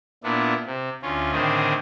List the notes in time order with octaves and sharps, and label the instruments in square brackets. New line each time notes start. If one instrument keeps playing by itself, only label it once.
[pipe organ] A#2 B3 D4 E4
C3
D2 C#4 F4
A2 D3 D#3 C4 G#4